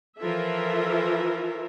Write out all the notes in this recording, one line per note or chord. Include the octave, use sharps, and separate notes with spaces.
E3 F3 F4 A4 A#4 E5